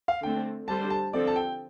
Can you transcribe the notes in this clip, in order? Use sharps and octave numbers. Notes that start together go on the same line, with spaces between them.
F5
D3 A3 C4 G5
D3 G3 D4 A4 C5 A5
A5
D3 F3 C4 A4 D5
A5
G5